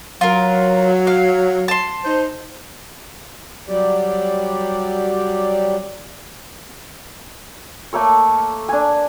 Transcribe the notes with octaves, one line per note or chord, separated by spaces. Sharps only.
F#3 F4 A#4
F5
A5 C6
D#4 C5
F#3 G3 G4 D5
A3 A#3 A4 C#5
D4 G#5